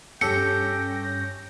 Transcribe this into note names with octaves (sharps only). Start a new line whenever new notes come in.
G2 C#4 G4 A4 G5 A#6 C#7